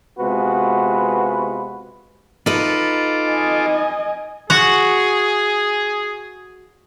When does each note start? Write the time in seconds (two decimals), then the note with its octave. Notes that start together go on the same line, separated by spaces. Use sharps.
0.19 C3 G#3 B3 F4 F#4 B4
2.46 D#4 F4 A4 B4 D6
3.28 D#5 G#5
4.50 F#4 G#4 F#5